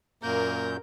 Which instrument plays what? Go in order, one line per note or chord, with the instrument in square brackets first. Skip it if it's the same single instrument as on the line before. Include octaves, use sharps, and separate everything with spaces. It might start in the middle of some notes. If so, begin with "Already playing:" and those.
[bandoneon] F#2 A#2 G6 [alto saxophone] A#3 [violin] A#4